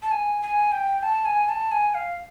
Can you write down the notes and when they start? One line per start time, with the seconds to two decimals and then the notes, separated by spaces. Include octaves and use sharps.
0.02 A5
0.11 G#5
0.42 G#5
0.72 G5
1.03 A5
1.25 G#5
1.49 A5
1.72 G#5
1.94 F5